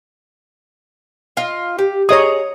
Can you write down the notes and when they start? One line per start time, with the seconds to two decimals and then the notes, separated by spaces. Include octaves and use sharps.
1.37 F4 D#5
1.79 G4
2.09 G#4 C#5 D#5 A#5 D#6